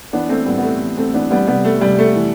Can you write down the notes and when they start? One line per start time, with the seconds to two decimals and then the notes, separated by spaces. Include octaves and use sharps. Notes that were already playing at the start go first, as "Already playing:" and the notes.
0.13 E3 B3 D4
0.29 A3 C4
0.46 A2 G3 B3
0.58 B3
0.63 A3
0.81 E3
0.97 A3 C4
1.14 E3 B3 D4
1.31 G3 B3
1.47 C3 G3 B3
1.65 A3
1.81 C3 G3
1.99 A3
2.16 E3